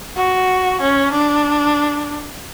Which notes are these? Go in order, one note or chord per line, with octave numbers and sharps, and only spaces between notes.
F#4
C#4
D4